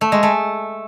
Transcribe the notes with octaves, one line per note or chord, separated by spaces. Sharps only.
A3
G#3
A3